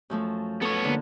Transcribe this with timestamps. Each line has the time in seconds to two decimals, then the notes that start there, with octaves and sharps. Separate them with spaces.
0.10 F#2 F3 A3
0.62 B3 A4 C#5
0.84 D3 A#3